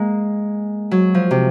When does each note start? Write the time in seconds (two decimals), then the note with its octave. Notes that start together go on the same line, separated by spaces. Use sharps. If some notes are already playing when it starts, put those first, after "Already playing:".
Already playing: G#3 A#3
0.91 F#3
1.14 F3
1.31 C3